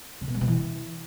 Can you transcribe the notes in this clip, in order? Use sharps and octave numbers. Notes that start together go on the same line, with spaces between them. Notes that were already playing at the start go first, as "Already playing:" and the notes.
C#3
B2
G3
B2
E3